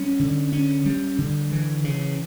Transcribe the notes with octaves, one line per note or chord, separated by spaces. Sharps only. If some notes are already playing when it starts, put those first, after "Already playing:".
Already playing: G3 C#4
D3
C#4
G3
D3
E3
C#3